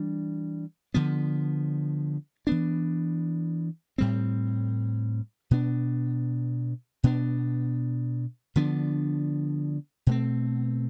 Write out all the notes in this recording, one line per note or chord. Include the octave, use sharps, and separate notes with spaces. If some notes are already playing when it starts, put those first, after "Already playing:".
Already playing: E3 G3 D4
D3 F3 B3
E3 B3 D4
A2 G3 C4
B2 B3 D4
B2 B3 D4
D3 F3 B3 D4
B2 A3 C4